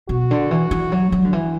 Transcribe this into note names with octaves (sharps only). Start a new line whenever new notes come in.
B2 F#4
D3
E3
E3
F#3
F#3
D3
E3